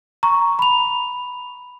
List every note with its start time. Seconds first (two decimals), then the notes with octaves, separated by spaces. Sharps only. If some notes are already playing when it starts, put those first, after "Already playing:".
0.23 A#5 C#6
0.59 B5 F7